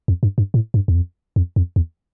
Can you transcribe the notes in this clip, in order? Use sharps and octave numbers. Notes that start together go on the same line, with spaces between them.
F2
G2
G2
A2
G2
E2
F2
F2
F2
E2